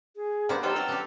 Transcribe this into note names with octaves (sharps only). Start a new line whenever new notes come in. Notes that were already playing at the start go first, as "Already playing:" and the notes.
G#4
G3 A#3 B3 D4 C5
B2 D#3 F#3 G4 A4 C6 F6
F#3 C4 B4
D4 G4